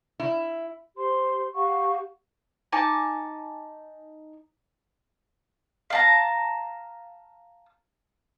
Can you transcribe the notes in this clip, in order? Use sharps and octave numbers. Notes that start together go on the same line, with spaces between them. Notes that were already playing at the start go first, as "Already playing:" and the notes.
E4
G4 C5 C6
G4 F5 F#5 C#6
D#4 G#5 A5 D6
F5 A5 A#5